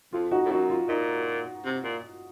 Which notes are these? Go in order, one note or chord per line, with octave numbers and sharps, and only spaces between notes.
F2 F4
D#4 F#4
A2
F#2 D#4 F#4
F4
A#2 D#4
C3
A#2